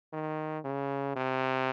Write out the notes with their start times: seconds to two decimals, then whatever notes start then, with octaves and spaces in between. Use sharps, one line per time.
0.13 D#3
0.65 C#3
1.16 C3